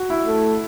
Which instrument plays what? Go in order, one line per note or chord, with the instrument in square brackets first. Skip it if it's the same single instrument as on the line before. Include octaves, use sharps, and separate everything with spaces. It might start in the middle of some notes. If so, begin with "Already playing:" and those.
Already playing: [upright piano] F#4
E4
[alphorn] A3